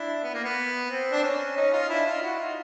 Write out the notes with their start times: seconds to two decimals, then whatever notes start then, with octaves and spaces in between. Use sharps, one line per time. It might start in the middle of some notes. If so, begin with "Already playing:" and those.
Already playing: D4 E4
0.23 B3
0.34 A#3
0.44 B3
0.90 C4
1.12 D4
1.23 C#4
1.56 C#4 D#4
1.73 D#4 F4
1.89 D4 E4
2.06 D#4 F4
2.22 E4 F#4
2.39 D#4 F4